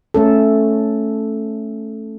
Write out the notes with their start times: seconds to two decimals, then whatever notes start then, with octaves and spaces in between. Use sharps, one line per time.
0.14 A3 C#4 A4